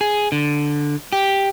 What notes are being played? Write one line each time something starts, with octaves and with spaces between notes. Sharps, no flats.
G#4
D3
G4